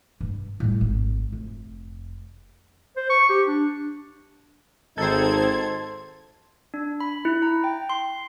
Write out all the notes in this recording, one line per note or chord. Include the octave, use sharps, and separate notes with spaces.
G2
A2 G3
G#1
F1
C5
C#6
G4
D4
G#1 C4 D#4 A4 C5 G#6
D4
B5
E4
A#5
G5
C6